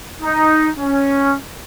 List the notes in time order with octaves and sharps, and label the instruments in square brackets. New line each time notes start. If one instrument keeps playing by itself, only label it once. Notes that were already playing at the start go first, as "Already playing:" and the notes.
[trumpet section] D#4
C#4